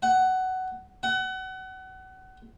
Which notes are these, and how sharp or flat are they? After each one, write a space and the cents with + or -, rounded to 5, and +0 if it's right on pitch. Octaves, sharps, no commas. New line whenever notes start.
F#5 +15
F#5 +30